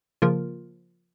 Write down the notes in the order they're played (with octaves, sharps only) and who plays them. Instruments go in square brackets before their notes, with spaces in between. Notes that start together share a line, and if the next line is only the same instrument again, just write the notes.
[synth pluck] C#3 F3 A#3 F4 A#4